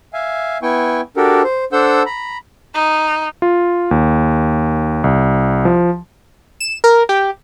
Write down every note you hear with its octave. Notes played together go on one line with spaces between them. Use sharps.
E5 F5 G#5
B3 E4 G5 G#5 C#6
D4 F#4 G4 A4 A#4
C5
D4 A4 C5 F#5 E6 G6
A#5 B5
D#4
F4
D#2
C2
F3
E7
A#4
G4